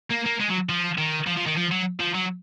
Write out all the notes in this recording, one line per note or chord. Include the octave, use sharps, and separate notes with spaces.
A#3
A#3
G#3
F#3
F3
D#3
F3
F3
D#3
F3
F#3
F3
F#3